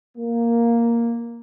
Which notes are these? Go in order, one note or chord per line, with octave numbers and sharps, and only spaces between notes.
A#3